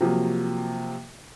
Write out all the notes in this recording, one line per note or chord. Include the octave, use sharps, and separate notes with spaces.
C3 F3 F#3 A#3